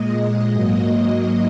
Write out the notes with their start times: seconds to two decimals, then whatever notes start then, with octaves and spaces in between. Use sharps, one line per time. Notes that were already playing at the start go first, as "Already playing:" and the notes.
Already playing: A#2 G#3 D#5
0.52 G#2 F#3 A#3